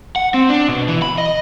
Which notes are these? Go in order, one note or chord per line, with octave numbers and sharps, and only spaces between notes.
F#5
C4
D4
B2
E3
B5
D#5